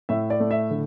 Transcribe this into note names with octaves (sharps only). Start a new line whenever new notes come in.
A2 E5
D5
A3
E5
D3